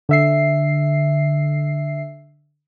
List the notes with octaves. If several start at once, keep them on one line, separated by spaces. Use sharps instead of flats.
D3 E5 C7